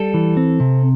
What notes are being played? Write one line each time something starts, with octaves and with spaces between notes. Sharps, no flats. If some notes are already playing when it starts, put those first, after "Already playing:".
Already playing: G3 A4
E3
C4
C3